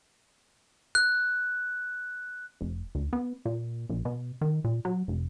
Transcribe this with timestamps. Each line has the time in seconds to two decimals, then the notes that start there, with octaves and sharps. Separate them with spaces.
0.95 F#6
2.61 F1
2.95 D2
3.13 B3
3.45 A#2
3.90 A#1
4.05 B2
4.41 D#3
4.64 A#2
4.85 F#3
5.08 F1